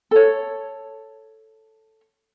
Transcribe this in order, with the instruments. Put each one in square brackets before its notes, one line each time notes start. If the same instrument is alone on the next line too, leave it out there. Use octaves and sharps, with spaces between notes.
[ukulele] A4 C#5